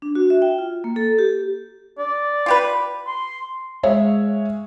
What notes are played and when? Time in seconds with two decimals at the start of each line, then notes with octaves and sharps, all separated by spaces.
0.02 D4
0.15 F#4
0.30 E5
0.42 G5
0.59 F4
0.84 A#3
0.96 A4
1.18 G4
1.99 D5
2.46 F4 G4 B4
3.07 C6
3.83 G#3 C#5 E5 F5